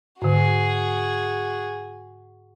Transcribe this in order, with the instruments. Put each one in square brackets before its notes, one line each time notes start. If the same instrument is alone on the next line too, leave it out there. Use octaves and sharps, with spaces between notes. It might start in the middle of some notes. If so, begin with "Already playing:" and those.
[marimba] G#2 D3 [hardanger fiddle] F#4 G#4